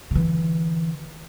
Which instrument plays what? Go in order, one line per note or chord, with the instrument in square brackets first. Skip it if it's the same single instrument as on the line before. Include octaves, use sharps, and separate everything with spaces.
[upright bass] D3 E3